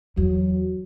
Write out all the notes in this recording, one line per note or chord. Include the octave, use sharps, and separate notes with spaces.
E2 F#3